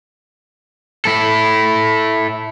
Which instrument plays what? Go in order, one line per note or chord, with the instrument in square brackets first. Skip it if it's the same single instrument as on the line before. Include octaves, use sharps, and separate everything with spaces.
[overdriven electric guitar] E4 A4